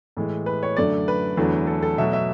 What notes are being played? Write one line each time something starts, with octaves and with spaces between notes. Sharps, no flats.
A2 E3 G#3
B4
C#5
F#2 D3 A3 D5
B4
E2 D3 F#3 A3
A4
A4
B2 F#3 A3 E5
E5